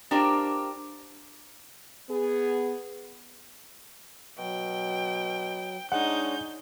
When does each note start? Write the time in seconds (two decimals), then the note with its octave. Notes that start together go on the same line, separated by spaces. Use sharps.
0.11 D4 F4 G4 A#4 C5
2.09 B3 G#4
4.38 B2 F#3 G5
5.92 G#3 D4 D#4 C#5 F#5 G6